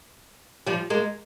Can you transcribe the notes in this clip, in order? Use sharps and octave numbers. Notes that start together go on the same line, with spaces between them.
F3 G3
G#3 A#3